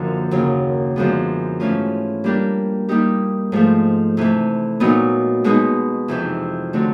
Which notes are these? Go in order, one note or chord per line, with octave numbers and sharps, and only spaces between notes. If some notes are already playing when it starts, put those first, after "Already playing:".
Already playing: F#2 D3 F3 A#3
D#2 C#3 F#3 A#3
F#2 D3 F3 G#3 B3
G#2 E3 A3 C#4 F4
G3 A#3 D4 G4 A#4
G3 A#3 D#4 G4
G#2 F3 A3
C3 E3 A3
A#2 F#3 B3 D#4
B2 G#3 B3 D#4
F2 C3 E3
D3 F#3 A3 C4